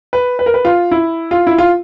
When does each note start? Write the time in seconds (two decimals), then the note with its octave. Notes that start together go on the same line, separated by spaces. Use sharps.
0.13 B4
0.39 B4
0.46 A#4
0.54 B4
0.65 F4
0.91 E4
1.31 F4
1.47 E4
1.58 F4